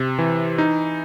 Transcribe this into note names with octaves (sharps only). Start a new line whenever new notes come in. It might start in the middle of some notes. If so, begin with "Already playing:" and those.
Already playing: C3
E3
D#4